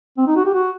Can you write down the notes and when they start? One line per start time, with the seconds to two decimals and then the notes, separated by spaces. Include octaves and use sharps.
0.18 C4
0.27 D#4
0.36 F#4
0.45 G4
0.54 F#4